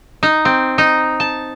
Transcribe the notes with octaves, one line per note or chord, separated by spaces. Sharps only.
D#4
C4
D#4
A5